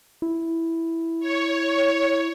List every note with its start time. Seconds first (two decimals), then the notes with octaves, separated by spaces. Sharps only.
0.22 E4
1.20 C#5